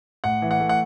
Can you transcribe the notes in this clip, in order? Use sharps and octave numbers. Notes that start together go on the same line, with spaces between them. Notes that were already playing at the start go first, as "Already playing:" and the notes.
A2 F#5
E3
F#5
A3
F#5